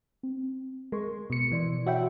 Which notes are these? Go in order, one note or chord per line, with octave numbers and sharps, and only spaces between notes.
C4
G#3 A#4 C6 C#6
B2 C#7
B2 E3 D5 C6
F#4 C#5 E5 G5 B5